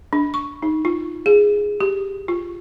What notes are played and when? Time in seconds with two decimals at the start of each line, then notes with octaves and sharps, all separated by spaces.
0.13 D4
0.34 C#6
0.62 D#4
0.85 F4
1.26 G#4
1.80 G4
2.28 F4